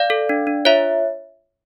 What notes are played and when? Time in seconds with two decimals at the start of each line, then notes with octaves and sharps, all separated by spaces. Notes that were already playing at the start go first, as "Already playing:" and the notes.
Already playing: D5 F5
0.10 A4
0.29 D4
0.47 D4
0.65 F4 C#5 E5